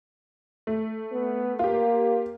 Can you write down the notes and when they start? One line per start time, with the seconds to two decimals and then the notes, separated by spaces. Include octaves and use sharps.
0.67 A3
1.13 B3
1.59 A#3 F4 G4